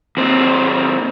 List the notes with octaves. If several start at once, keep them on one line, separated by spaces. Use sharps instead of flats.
D#2 C4